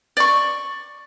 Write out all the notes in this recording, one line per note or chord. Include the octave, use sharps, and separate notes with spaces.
D5 C#6